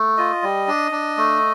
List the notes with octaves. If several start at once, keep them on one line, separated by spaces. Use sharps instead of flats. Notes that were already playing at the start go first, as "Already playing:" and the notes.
Already playing: A3
F4 D#5
G3
D4
D4
A3